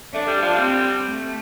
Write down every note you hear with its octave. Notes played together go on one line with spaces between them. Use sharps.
A3 D4
G3
F3
G3
C4
A3